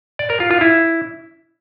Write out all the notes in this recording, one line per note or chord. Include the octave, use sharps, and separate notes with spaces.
D5
A#4
F4
F4
E4